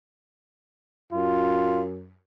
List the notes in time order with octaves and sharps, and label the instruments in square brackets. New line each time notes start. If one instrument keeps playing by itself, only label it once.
[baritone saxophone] F#2 [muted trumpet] F4